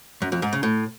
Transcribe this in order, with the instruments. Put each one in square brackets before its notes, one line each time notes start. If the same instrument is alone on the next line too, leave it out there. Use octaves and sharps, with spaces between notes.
[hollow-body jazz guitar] F#2
F2
G#2
C#3
A2